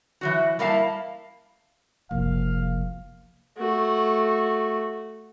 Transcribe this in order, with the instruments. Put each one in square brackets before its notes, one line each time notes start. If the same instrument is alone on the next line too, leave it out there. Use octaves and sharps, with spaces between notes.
[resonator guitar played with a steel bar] E3 F#3 F#4
G3 A#3 E4 F5 A5
[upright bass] F#1 C2 [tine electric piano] C3 F3 A#3 [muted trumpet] F5
[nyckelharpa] A3 F#4